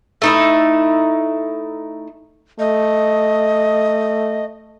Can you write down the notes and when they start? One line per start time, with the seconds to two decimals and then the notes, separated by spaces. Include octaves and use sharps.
0.22 A3 D#4 E4
2.59 A3 D#5